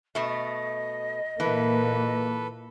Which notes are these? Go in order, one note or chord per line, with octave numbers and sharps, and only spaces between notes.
B2 A3 D#5
A#2 E3 A#3 A4 B4